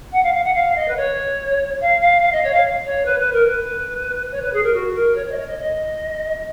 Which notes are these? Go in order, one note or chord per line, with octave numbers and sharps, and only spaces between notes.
F#5
F5
F5
F#5
F5
D#5
B4
C#5
F5
F5
F5
D#5
C#5
F5
C#5
B4
B4
A#4
B4
C#5
B4
G#4
A#4
F#4
A#4
C#5
C#5
D#5
C#5
D#5
D#5